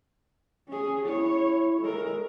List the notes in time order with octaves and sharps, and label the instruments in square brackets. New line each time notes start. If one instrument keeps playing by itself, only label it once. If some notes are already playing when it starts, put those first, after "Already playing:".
[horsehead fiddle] C#4 G#4
[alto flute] E4 [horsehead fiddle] C#5
[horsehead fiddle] G#3 A#4 [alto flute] A4